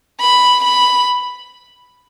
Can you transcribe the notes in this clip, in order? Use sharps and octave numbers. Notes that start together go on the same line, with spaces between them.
B5
B5